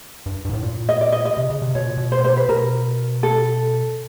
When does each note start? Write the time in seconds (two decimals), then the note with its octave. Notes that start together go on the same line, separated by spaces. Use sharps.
0.26 G2
0.45 G2
0.50 G#2
0.53 A2
0.63 A#2
0.89 D#5
1.01 D5
1.12 D#5
1.25 D#5
1.37 C3
1.50 C#3
1.62 C3
1.75 B2 C#5
1.87 A#2
1.97 B2
2.12 C5
2.24 C5
2.37 B4
2.49 B2 A#4
3.23 A4